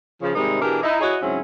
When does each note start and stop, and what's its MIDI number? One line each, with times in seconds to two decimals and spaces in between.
0.22 0.35 49
0.22 0.35 53
0.35 0.58 44
0.35 0.58 48
0.35 0.58 51
0.35 0.58 55
0.35 0.58 56
0.35 0.58 63
0.62 0.79 47
0.62 0.79 52
0.62 0.79 62
0.62 0.79 67
0.62 0.79 68
0.62 0.79 70
0.83 0.99 63
0.83 0.99 64
1.01 1.17 64
1.01 1.17 66
1.01 1.17 68
1.01 1.17 73
1.01 1.17 75
1.22 1.40 44
1.22 1.40 49
1.22 1.40 54
1.22 1.40 60
1.22 1.40 61
1.22 1.40 64